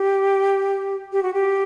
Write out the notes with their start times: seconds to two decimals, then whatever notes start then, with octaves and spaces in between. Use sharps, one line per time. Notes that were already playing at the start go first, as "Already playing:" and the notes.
Already playing: G4
1.12 G4
1.23 F#4
1.34 G4